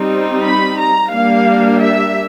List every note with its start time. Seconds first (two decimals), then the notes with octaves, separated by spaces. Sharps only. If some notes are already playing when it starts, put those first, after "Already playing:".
Already playing: G3 C4 D#4
0.44 B5
0.78 A#5
1.11 G3 A#3 D4 F5
1.80 E5